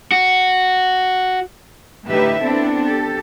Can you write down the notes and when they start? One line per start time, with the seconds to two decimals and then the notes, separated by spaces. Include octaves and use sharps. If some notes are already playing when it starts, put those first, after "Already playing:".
0.12 F#4
2.07 A2 D3 D#4 G4 B4 E5
2.44 B3 C4 D4 E4 A4
2.86 G4 A4